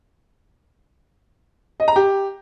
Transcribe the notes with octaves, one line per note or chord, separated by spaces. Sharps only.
D#5
A#5
G4